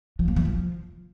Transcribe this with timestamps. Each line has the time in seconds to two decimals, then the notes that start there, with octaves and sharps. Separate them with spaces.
0.19 F3
0.28 A#3
0.36 E3
0.45 F3